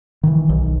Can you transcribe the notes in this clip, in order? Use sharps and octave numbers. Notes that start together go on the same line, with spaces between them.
D#3 E3
B1